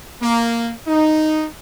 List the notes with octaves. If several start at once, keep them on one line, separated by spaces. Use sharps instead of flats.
A#3
D#4